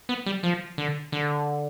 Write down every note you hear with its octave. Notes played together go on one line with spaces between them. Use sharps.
B3
G3
F3
D3
D3